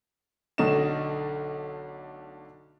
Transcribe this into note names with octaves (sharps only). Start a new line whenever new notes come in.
B1 D3 A3 D#5 E7